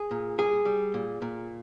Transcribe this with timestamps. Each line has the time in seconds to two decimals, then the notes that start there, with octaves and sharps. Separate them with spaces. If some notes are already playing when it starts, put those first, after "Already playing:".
Already playing: G#4
0.11 A#2
0.38 G3 G#4
0.65 G3
0.94 A#2
1.22 A#2